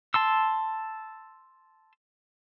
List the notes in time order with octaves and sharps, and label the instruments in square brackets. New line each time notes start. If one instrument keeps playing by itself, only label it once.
[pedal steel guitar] A5 C6 E6